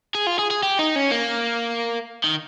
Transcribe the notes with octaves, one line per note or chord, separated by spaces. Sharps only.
G#4
F4
G#4
G#4
G4
D#4
C#4
A#3
D#3